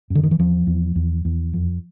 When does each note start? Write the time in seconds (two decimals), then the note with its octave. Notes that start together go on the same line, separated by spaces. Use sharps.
0.10 F#2
0.15 D3
0.23 D#3
0.31 E3
0.39 E2 F3
0.67 E2
0.96 E2
1.25 E2
1.53 F2